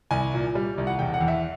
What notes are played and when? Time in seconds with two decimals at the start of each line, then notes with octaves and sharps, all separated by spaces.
0.11 C2 G#5
0.34 A#2
0.55 G3
0.78 C2
0.87 F#5
0.99 E1 G5
1.14 F#5
1.21 E2
1.28 E5